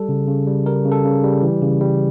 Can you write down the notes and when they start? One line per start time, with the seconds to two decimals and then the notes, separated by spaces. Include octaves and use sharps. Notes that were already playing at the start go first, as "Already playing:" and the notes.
Already playing: G3 A4
0.09 C#3
0.28 C#3
0.47 G3
0.66 G3 A#4
0.85 C#3
0.92 A4
1.05 C#3
1.24 G3
1.43 E3
1.62 C#3
1.81 G3